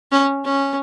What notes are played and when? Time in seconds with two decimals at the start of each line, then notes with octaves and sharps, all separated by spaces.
0.12 C#4
0.45 C#4